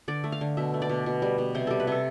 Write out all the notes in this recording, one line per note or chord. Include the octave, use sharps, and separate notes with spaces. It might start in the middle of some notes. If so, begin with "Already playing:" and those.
D3 D5
A3
F5
D3
B2 E5
A3
D5
B2
B2
G3
B2
C3 C5
G3 A4
B4
C3 A4